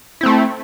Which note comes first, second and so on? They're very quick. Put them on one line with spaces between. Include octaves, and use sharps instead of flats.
E4 C4 A3